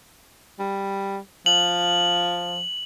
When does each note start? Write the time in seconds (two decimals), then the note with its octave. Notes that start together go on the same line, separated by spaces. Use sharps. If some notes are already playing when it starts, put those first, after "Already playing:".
0.59 G3
1.46 F3 F#7